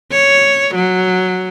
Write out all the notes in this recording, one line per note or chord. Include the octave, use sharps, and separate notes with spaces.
C#5
F#3